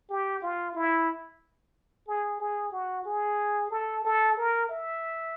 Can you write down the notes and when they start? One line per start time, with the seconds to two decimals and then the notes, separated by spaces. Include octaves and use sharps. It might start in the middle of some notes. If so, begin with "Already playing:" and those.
0.09 G4
0.42 F4
0.75 E4
2.08 G#4
2.40 G#4
2.72 F#4
3.05 G#4
3.71 A4
4.04 A4
4.38 A#4
4.69 E5